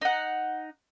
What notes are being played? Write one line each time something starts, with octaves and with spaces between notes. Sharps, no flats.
D#4 F#5